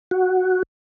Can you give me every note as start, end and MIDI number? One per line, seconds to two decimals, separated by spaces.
0.11 0.63 66